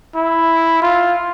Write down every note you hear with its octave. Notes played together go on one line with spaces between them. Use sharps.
E4
F4